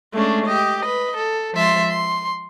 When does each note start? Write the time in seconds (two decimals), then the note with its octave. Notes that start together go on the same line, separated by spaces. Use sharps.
0.12 G#3 A3 C#4 D4
0.47 G4 D#5
0.81 B4 D#5
1.17 A4
1.53 F3 G#3 E5 C6 A6
1.88 C6